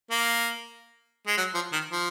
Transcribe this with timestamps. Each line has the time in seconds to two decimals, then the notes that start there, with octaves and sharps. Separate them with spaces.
0.11 A#3
1.27 G#3
1.37 F#3
1.54 F3
1.72 D#3
1.90 F3